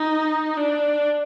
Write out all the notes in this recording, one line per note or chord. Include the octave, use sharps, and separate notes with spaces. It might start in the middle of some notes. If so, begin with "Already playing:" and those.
Already playing: D#4
D4